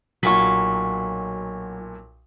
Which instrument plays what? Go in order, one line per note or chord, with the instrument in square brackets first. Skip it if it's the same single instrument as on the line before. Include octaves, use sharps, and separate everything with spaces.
[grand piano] B1 A#2 [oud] F#3 F4 [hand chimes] C#6 B6